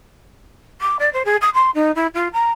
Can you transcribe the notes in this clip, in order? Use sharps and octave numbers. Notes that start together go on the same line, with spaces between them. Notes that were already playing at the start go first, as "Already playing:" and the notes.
D6
D5
C5
G#4
D#6
C6
D#4
E4
F4
A#5